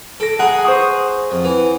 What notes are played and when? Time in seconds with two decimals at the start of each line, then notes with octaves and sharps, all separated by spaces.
0.20 A4 A#6 D7
0.39 G#4 F#5 A#5
0.65 C5 C#6 D#6
1.31 F2
1.44 E3